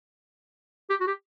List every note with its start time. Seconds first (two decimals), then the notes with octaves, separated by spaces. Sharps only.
0.90 G4
1.01 F#4
1.07 G4